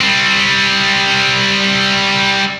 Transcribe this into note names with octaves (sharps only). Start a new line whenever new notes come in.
G3 C4